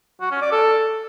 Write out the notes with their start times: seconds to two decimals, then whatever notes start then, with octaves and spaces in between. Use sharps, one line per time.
0.21 F#4
0.31 C#4
0.42 D5
0.52 A4